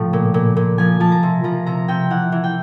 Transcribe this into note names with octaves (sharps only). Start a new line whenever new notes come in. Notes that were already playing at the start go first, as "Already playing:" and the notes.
Already playing: A2 C#3 F3
A#2
A#2
A#2
F3 G#5
F3 A5
A#5
C3
F3 A#5
C3 A#5
C3 G5
E3 F#5
E3
G5